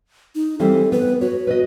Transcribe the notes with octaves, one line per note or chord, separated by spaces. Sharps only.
D#4
E3 G3 C4 A4
B3 B4
F#4 B4 C#5
B4 D5 D#5